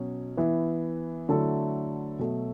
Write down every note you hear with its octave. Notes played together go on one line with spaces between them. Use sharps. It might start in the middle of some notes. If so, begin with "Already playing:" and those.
Already playing: B2 F#3 C#4
E3 B3 E4
D3 F#3 A3 E4 A4
B2 F#3 A3